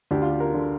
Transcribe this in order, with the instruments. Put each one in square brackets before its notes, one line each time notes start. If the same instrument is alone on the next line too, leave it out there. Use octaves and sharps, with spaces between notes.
[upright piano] D2 D4 G4
F4
G4
F4 A#4
D3